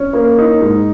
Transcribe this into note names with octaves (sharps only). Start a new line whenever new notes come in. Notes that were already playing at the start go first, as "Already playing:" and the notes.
Already playing: C#4
A#3
D#4
G#2